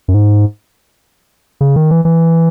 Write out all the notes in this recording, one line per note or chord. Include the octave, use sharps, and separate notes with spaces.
F#2
G#2
C#3
D#3
E3
E3